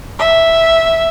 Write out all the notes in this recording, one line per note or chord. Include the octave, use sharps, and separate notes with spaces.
E5